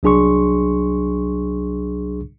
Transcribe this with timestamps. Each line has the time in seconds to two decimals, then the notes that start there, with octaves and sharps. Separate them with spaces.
0.03 C2 F#3 D4 G#4 C6 C#6